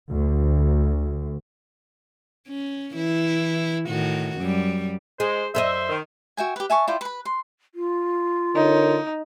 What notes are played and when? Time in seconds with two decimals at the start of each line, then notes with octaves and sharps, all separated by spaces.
0.11 D2
2.48 C#4
2.94 E3 E4
3.89 A2 D#3 F#4
4.38 F#2 G3
5.20 G#3 G#4 C5
5.55 F#2 A4 C5 D#5 E5
5.89 D#3
6.37 F#4 E5 G5 G#5
6.56 G4 B4
6.70 E5 G#5 A5 C#6
6.88 E4 F4 D5 G5
7.01 B4 B5
7.25 C6
7.75 F4
8.55 D3 D#4 A#4 C#5